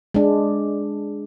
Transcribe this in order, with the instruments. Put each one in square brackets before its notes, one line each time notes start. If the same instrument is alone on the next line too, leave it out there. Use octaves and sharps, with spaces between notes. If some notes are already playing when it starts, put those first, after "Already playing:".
[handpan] G#3 D4